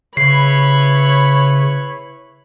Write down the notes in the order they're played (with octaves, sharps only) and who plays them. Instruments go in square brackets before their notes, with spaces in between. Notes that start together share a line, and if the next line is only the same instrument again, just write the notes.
[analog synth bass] C#3 [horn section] E4 B4 C#5 [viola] B5 [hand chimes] C7